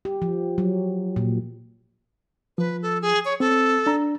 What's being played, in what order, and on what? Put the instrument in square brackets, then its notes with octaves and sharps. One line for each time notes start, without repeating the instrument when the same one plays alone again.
[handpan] G4
F3
F#3
A#2
[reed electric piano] F3 [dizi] B4
[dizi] A4
G#4
C#5
[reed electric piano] C4 [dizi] A4
[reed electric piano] D4 A#5